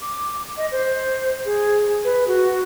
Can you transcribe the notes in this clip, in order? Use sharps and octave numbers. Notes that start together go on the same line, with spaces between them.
D6
D#5
C5
G#4
B4
F#4